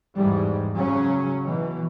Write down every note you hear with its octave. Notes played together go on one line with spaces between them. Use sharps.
E2 G#2 G3 G#3
C#3 F#3 C#4
B2 E3